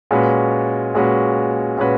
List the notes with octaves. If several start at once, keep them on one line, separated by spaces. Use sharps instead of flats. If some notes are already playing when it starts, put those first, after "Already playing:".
A#2 G#3 C#4 F#4 B4
A#2 G#3 C#4 F#4 B4
A#2 G#3 C#4 F#4 B4